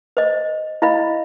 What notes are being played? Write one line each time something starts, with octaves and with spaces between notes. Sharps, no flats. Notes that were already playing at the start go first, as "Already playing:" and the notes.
C5 D#5
E4 D#5 F5 B5